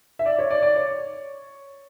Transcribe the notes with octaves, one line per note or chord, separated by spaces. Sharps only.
E5
D5
C#5
D5
D5
C#5